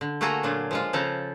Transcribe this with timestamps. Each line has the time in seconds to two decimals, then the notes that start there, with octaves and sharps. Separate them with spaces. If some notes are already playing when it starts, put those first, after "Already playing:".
0.01 D3
0.21 A3 A#3 F#4 G#4 A4 A#5
0.43 A#2 F#3 D4 F4
0.71 F3 G#3 F4
0.93 C#3 F3 A4 A#5